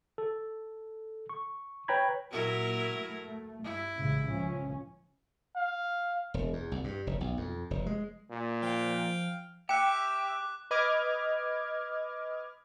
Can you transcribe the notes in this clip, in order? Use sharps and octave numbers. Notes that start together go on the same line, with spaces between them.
A4
C#6
B4 C#5 G5 A#5 B5 G#6
A#2 F#3 E4 A#4
A3
G2 E4
A1 G#2 C#3
C#2 F3 C#4
F5
E1
E2
C2
G2
F1
B1
F2
F1
G#3
A#2
F3 F5 G5
G4 E5 G5 D6 F#6
B4 D#5 D6 F6 G#6